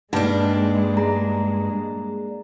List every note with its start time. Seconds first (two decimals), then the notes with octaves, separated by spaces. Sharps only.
0.13 G2 G3 G#3 A#3 D4 D#4
0.97 G#4 A#5